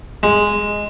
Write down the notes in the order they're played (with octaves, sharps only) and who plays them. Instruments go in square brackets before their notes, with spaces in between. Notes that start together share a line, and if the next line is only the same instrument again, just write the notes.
[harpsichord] G#3